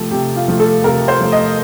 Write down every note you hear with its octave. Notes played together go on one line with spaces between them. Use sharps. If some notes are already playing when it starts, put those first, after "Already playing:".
Already playing: C3 F3 A3 G4 A4
C3 G4
F4
F3 A3
A4
C3 A#4
C5
F3 A3
D#5